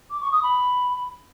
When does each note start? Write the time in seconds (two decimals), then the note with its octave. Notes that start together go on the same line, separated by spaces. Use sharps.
0.10 D6
0.21 C#6
0.32 D#6
0.43 B5